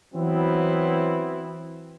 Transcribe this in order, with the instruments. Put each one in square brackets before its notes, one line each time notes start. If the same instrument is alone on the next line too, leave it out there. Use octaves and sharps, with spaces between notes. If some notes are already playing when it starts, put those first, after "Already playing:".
[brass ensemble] E3 F#3 B3 C4 E4